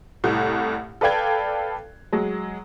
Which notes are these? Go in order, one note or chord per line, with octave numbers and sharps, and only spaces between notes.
C2 A2
A4 B4 D5 F5 G5 G#6
F#3 G#3